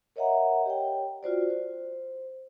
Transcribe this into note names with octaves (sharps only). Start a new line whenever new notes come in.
A#4 C#5 D#5 E5 F#5 A#5
G4 C#5 G5
F4 F#4 C5 D5
C5